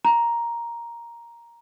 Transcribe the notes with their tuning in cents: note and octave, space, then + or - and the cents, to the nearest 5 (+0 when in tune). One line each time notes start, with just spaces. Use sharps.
A#5 +5